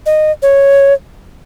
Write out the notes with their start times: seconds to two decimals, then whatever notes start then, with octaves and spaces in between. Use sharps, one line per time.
0.06 D#5
0.42 C#5